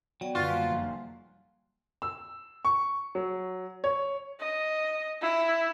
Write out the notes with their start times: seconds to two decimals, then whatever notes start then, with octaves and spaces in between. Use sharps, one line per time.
0.21 F#3 B3 D5 G5
0.35 F#2 D3 F4 F#4 B4
0.48 G3 A#3 C5
0.70 F1
2.02 E6
2.65 C#6
3.15 F#3
3.84 C#5
4.40 D#5
5.22 E4